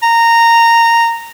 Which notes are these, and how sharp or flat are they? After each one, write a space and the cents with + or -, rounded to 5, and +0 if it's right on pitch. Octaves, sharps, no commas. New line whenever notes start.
A#5 -10